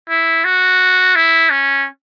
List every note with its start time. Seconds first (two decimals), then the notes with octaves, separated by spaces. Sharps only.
0.09 E4
0.44 F#4
1.15 E4
1.50 C#4